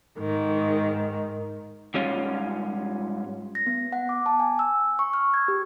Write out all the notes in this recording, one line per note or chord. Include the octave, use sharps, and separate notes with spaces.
G#2 D#3
G#2 G3 C#4 F4
A#6
B3
F#5
D6
A5
G#5
E6
C#6
F6
G#6
G4